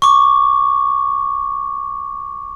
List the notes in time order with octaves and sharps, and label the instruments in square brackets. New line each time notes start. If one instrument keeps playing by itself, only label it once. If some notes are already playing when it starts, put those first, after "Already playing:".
[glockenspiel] C#6 D6